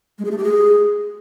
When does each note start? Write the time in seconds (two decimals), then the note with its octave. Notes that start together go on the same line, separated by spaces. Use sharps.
0.18 G#3
0.25 G#4
0.31 A3
0.38 G4
0.44 G#4